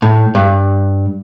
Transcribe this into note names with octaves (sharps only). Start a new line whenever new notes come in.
A2
G2